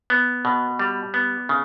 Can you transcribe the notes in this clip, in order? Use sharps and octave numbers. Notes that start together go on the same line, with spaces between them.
B3
B2
G3
B3
C#3